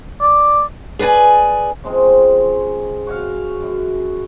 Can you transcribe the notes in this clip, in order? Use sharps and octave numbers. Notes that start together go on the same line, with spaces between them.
D5
G#4 B4 D5 G5 G#5
C#3 F3 G#3 C4
F#4 C#5 F5
F#2